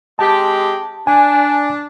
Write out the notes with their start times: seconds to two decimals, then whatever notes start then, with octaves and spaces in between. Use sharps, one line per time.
0.19 G#3 C4 G4 A5
1.07 D4 G#5